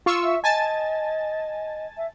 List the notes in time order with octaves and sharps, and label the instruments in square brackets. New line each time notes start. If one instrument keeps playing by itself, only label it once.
[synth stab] F4 C#6 E6
[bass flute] E5
[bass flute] D#5 [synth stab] G#5 A5 A6
[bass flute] E5